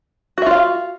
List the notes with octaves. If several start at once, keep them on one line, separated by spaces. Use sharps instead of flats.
F4 F#4 E5 F5